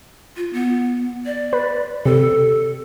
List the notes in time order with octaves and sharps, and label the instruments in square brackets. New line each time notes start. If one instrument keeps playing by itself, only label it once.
[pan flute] F4
B3
D5
[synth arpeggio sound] B4
[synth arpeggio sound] C3 [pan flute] A4